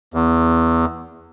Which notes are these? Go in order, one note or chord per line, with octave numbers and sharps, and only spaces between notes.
E2